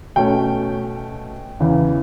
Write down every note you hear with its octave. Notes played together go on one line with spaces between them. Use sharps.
B2 A3 C#4 G5
E2 C#3 E3